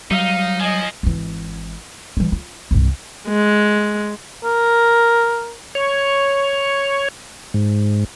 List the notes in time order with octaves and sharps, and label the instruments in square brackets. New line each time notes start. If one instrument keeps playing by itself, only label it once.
[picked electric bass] F#3 G3 [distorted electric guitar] D#4 [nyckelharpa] F5
[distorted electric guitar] F3 [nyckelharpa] D#5 G#5
[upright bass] G#1 E3
E3 G3
F4
C2 G2
[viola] G#3
[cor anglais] A#4
[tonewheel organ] C#5
G#2